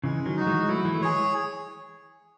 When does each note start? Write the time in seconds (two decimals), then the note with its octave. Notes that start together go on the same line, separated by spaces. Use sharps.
0.04 C#3 E3 G#3
0.26 D#3 F#3
0.37 D#4 F#4
0.47 E3 G#3
0.68 F#3 A3 E4
0.85 E3 G#3
0.95 A3
1.01 E3 G#3 G#4 C#5